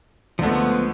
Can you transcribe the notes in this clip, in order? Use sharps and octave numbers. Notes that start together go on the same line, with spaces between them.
C#2 D3 F3 A3 B3